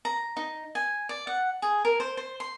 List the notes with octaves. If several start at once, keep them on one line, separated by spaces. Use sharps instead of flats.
A#5
D#4
G#5
D5
F#5
G#4
A#4
C5
C5
C6